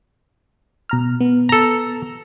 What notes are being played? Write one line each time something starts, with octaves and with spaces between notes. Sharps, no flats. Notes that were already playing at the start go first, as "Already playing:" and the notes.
B2 A#5 F6
B3
A4 A#5